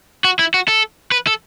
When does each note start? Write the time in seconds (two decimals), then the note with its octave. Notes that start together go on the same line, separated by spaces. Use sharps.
0.24 F#4
0.39 E4
0.54 F#4
0.68 A4
1.12 B4
1.27 A4